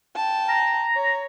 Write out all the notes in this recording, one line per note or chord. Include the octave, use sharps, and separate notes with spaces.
G5 A5
A#5
C#5